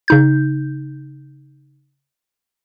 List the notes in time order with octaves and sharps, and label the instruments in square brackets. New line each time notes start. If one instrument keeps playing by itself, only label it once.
[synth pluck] C#3 D#4 G6